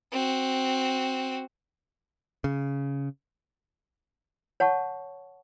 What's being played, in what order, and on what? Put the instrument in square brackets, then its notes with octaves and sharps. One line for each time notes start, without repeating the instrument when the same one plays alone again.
[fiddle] C4 F#4
[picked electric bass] C#3
[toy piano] C#5 F#5 A5 C#6